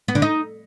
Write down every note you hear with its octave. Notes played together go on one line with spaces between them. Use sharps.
B3
D3
D#4